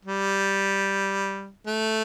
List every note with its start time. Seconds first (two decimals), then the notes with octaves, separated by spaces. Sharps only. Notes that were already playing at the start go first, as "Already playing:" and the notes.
0.05 G3
1.67 A3